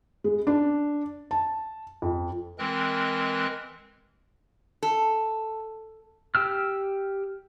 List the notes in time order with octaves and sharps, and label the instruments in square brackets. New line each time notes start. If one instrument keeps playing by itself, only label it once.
[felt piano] G#3
D4
A5
F2
[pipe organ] E3 G#3 C4 A#4 F#6
[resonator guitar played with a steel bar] A4
[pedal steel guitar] G4 G5 E6 F6